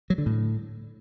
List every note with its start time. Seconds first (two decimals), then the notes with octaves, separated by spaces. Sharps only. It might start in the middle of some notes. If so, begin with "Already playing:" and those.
0.10 F#3
0.18 D3
0.26 A2